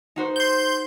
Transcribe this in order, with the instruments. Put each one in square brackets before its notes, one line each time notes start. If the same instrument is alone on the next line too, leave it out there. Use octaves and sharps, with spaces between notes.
[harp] D#4 F#4 C5
[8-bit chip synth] C6 G6